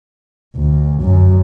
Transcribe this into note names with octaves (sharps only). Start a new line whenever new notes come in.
D2
F#2